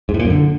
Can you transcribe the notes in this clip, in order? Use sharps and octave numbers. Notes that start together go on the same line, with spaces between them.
G#2
A2
A#2
F#2
D3